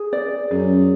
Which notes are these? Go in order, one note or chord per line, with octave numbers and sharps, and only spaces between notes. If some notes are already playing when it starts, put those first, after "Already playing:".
Already playing: G#4
D5
F#2 G#4